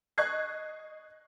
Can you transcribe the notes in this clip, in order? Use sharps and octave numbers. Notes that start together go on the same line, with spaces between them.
D#5 C#6 F#6 G#6 C7